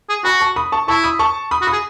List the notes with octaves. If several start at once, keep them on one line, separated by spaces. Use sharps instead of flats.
G#4
F#4 G#5 B5
A5 C#6
B5 D#6
A5 C#6
E4 A5 C#6
B5 D#6
A5 C#6
B5 D#6
F#4
B5 D#6
G#4